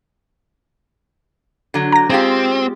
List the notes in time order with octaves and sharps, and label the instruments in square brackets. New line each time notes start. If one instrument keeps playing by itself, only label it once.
[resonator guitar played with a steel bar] D3 F#3
[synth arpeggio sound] A#5 A#6
[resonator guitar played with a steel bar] G#3 F4 G4 [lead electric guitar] C4